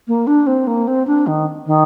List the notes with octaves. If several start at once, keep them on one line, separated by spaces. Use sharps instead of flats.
A#3
D4
C4
A#3
C4
D4
D#3
D#3